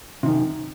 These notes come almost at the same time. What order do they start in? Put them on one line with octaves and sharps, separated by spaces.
C3 D#3 F#2